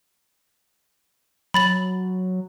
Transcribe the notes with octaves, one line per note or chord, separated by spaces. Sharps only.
F#3 B5 A6 F#7